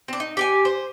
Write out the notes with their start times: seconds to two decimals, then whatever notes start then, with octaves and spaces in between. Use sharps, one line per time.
0.08 C4 D4
0.20 D#4
0.37 G4 G5 G#5
0.65 C5